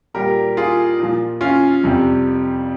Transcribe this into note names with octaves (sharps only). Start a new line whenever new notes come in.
A#2 G3 G4 A#4
F4 G#4
A#2 F3
C#4 F4
F2 C3 G3